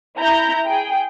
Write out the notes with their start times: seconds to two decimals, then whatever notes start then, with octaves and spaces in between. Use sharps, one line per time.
0.18 E4 A#5 G6
0.66 G#4 G5